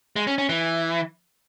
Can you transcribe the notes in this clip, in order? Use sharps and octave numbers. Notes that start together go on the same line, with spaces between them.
G#3
C#4
C#4
E3